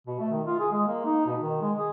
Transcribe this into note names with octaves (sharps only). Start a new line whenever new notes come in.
B2
A3
D#3
F4
G#4
G#3
A#3
D#4
B2
D#3
G#3
G#4